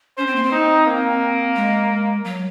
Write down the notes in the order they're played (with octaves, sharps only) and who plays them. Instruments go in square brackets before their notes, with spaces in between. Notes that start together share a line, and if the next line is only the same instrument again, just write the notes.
[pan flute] C#4 [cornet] C5
[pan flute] C4
A#3
C4
[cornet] D#4
A#3
[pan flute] G#3
F#3